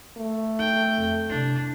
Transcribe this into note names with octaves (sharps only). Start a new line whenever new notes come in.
A3
D#4 G5
F2
C3 D4 E4